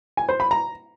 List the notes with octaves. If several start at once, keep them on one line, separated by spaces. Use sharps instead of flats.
G#5
C5
B5
A#5